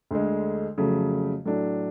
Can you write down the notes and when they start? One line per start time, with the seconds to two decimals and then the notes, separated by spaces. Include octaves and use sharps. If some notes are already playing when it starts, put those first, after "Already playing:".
0.11 D2 D3 G#3
0.78 F2 C#3 F#3 A3
1.45 A2 F#3 A3 D4